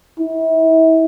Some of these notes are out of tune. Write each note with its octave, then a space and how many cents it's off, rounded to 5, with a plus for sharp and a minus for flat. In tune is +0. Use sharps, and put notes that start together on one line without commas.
E4 -35